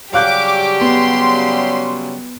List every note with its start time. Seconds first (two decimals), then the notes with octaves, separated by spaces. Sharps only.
0.13 C#3 F#3 G3 G4 F5 D6 F#6 G6
0.81 B3 C6